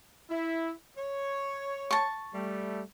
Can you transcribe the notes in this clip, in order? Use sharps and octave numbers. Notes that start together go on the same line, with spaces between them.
E4
C#5
A5 C#6
G3 A3